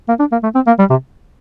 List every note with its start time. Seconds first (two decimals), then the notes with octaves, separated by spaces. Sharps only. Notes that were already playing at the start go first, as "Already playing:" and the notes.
0.08 A#3
0.20 D4
0.32 A#3
0.43 A3
0.55 C4
0.67 A#3
0.79 G3
0.90 C3